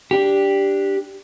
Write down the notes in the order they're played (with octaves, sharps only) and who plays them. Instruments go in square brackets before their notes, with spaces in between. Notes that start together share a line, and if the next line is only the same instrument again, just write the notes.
[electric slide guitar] D4 G4